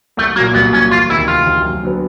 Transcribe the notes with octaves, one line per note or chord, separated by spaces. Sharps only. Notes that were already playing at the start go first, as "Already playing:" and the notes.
C2 A3
A#2 F#3 A#3
C2 B3
A#2 F#3 C#4
E1 F4
D2 C3 D#3 E4
E1 F4
D2 C3 D#3
F#2
D3 F#3 B3